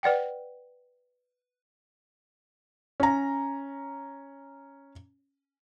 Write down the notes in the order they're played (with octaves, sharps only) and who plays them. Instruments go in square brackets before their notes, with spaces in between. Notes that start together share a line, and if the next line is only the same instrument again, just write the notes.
[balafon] B4 D5 F#5 G5
[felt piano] C#4 A#5